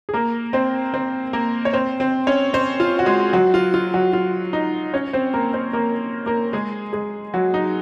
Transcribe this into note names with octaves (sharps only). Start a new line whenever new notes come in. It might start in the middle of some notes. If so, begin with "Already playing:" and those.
G#4
A#3 A#4
C4 C5
C4 C5
A#3 A#4
C#5
C4 C5
C4 C5
C#4 C#5
C4 C5
F4
F#4
G#3 G#4
F#3 F#4
F4
F4
F#3 F#4
F4
D#4
C#4 C#5
C4 C5
A#3 A#4
C4 C5
A#3 A#4
A#3 A#4
G#3 G#4
G#3 G#4
F#3 F#4
D#4